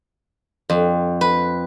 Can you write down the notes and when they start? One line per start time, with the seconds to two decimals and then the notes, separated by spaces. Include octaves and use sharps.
0.69 F2
1.21 B4